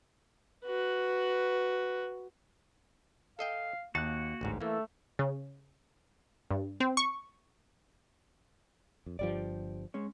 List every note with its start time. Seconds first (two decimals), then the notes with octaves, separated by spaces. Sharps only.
0.64 F#4 B4
3.39 A4 D#5 F5 G5
3.95 D#2 A#3 F#4 A5 F#6
4.41 A1 D2 G#2
4.61 E3 A3 A#3 A4
5.19 C#3
6.51 G2
6.80 C4
6.97 C#6
9.06 F2
9.19 G1 G2 F3 G4 D5
9.94 G#3 C#4